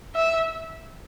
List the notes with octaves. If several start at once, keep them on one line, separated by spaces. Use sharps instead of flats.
E5